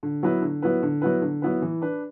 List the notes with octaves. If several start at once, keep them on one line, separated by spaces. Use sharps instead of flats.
D3
F#3 B3 E4 B4
D3
F#3 B3 E4 B4
D3
F#3 B3 E4 B4
D3
F#3 B3 E4 B4
E3
D4 B4